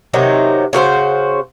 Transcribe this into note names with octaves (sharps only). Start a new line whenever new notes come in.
C3 D#3 F#3 D#4
C#3 F#4 B4 C5